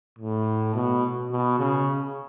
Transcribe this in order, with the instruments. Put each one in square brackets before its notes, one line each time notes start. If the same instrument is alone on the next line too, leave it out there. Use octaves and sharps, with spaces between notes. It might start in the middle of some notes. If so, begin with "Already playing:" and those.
[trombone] A2
B2
B2
C#3